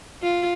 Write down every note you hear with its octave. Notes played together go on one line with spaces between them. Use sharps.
F4